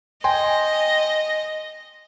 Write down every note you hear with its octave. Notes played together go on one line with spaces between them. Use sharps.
D#5 G5 G#5 C6